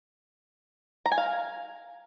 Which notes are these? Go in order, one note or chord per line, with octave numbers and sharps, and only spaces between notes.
A#5
G#5
F5